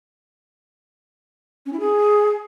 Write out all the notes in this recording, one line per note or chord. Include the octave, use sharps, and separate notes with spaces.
C#4
E4
G#4